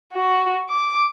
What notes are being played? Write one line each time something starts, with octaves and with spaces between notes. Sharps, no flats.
F#4
D6